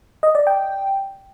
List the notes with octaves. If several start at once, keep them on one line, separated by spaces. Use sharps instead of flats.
D#5
D5
G5